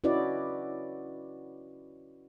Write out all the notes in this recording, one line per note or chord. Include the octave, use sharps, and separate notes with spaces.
C#4 E4 F#4 B4 D5 D#5